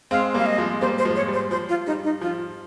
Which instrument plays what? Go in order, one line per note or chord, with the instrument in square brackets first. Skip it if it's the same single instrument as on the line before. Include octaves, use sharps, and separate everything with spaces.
[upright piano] G#3 C4 [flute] F5
[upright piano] G3 A#3 [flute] F5
[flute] D#5
[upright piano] F3 G#3
[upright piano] G3 A#3 [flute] C5
[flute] C5
[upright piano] F3 G#3
[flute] C#5
[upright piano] G3
[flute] C5
[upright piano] F3 [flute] C5
[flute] F4
[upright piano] G3 [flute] D#4
[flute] D#4
[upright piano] F3 [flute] F4